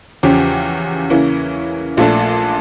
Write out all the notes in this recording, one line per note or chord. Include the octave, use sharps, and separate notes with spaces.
E2 C#3 F3 C#4 G4
C#3 E3 A#3 C#4 E4
A#1 A#2 A3 D4 A4